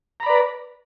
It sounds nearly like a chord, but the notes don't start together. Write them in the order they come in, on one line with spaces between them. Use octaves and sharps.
A#5 B5 D5 B4